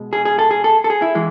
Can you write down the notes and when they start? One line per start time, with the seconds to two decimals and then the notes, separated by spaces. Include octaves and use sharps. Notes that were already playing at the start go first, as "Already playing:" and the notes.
Already playing: B2 G#3
0.13 G#4
0.25 G#4
0.39 A4
0.51 G#4
0.64 A4
0.84 A4
0.90 G#4
1.02 E4
1.15 E3 G#3